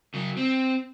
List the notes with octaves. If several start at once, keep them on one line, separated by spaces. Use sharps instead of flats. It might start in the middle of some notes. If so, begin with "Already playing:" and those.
C#3 F#3
C4